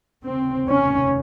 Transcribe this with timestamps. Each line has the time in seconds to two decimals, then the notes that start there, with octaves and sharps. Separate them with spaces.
0.24 F1 D#2 C#3 C4
0.68 C#4